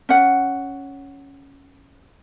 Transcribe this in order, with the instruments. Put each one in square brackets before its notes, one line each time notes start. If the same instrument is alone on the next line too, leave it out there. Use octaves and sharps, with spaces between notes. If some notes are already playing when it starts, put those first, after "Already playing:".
[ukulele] C#4 F#5